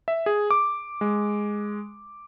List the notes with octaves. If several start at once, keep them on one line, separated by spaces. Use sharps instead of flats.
E5
G#4
D6
G#3